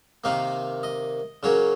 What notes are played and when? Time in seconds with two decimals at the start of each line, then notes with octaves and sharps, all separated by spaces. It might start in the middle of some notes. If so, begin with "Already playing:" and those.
0.24 C3 D#3 A#3 F5
0.83 D#5
1.43 C#3 F#3 A#3 C#5